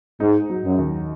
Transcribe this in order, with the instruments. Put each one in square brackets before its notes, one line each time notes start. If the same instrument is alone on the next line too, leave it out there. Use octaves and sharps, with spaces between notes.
[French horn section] G#2 [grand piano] D#4
[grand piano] F#3
[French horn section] F#2
[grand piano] D#2